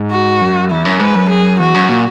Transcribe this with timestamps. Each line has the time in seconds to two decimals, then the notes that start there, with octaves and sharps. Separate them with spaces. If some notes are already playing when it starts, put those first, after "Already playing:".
Already playing: G#2
0.11 F#4
0.41 F#2
0.70 E2 E4
0.85 F#2
1.00 G#2 B4
1.15 F#2
1.29 G#4
1.60 E2 F#4
1.74 F#2
1.89 A#2